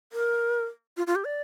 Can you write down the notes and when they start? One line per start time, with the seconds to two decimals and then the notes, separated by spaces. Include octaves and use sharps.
0.13 A#4
0.97 F4
1.07 F4
1.15 G4
1.25 D5